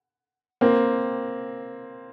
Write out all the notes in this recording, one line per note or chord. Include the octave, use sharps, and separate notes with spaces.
A#3 C4